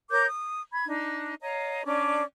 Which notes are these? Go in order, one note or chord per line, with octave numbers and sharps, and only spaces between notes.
A#4 C#5 D6 G6
D#6
B5 G#6
D4 D#4
C#5 D#5 F5 A#5
C#4 D4 D5 D6